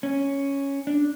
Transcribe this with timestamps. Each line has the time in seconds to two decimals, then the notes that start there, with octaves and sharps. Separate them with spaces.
0.03 C#4
0.87 D4